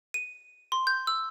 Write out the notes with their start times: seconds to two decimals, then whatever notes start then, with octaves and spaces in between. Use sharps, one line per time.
0.14 D#7
0.72 C6
0.87 G6
1.07 E6